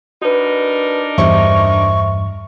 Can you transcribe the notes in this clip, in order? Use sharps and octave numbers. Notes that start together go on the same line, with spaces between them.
D4 D#4 F#4 A#4 B4
E2 G2 C5 E5 C#6